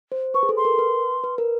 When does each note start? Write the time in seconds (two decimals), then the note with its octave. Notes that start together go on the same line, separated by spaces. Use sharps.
0.12 C5
0.34 B4 C#6
0.43 G#4
0.49 A4
0.57 C6
0.65 A#4
0.79 B4
1.24 B4
1.38 A#4